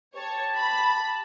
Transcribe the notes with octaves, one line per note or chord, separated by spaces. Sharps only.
G4 C#5 A5
B5